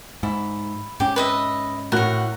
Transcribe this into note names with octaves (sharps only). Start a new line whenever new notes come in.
G#2 E4
G#2 C#4 G4
B4 D#5 E5
A2 F#4 A#4 F#5 F#6